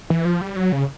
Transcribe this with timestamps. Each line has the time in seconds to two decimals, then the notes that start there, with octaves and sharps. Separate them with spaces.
0.10 E3
0.25 F3
0.41 G3
0.56 F#3
0.72 C#3